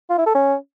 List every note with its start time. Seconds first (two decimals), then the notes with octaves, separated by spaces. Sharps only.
0.09 F4
0.18 E4
0.26 A4
0.34 C#4